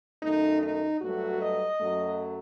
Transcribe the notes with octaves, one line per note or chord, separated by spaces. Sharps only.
F#2 D#3 A3 D#4
D#4
G2 F#3 A3 F#4
D#5
F#2 F#3 A3